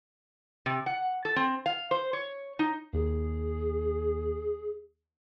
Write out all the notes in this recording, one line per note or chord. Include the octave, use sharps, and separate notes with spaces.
C3
F#5
A4
C4
F5
C5
C#5
D#4
D#2 G#4